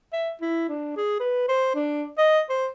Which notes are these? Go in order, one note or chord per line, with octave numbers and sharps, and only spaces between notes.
E5
E4
D4
G#4
B4
C5
D4
D#5
C5